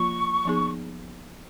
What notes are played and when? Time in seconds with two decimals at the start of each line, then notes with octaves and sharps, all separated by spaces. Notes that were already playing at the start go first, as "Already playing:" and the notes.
Already playing: F3 A#3 F4 C#6
0.45 F3 B3 D#4 G#4